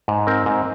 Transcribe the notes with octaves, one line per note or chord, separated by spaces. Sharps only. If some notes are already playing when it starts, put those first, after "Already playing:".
G#2
C4 A#4
G#2